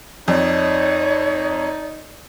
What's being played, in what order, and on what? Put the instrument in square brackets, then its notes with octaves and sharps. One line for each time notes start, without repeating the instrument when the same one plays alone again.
[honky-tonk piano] F2 [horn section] D#4 [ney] C#5 [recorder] D5